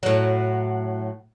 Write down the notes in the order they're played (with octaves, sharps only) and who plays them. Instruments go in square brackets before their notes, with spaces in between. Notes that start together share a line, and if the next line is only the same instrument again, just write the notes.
[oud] A2 F#3